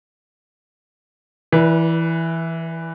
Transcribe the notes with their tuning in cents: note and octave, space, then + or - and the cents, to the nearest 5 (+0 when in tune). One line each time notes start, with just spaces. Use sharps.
E3 +0 B4 -35 D5 +0